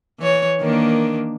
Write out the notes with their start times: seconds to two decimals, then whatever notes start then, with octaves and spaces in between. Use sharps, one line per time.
0.19 E3 C#5
0.61 D#3 A#3 D4